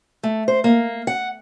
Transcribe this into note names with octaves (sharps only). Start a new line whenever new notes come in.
A3
C5
A#3
F#5